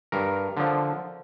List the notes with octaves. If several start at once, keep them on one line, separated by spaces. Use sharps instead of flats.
G2 A#4
D3 F3